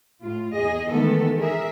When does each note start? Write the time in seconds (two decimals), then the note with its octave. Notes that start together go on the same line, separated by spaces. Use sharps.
0.21 A2 F4
0.55 E2 G#4 D#5
0.90 D#3 E3 G#3 A3 B3 A4
1.39 G#4 A#4 E5